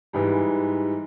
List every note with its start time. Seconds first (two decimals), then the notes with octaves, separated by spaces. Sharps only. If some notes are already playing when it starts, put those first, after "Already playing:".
0.13 G#2 E3 G3